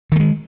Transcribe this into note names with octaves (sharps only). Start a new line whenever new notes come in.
D#3 G#3 A3